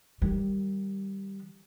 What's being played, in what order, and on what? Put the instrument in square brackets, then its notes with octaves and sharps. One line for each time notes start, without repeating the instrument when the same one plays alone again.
[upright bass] D#3 G3